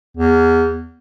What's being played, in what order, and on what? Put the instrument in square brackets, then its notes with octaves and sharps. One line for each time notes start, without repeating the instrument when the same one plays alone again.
[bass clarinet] E2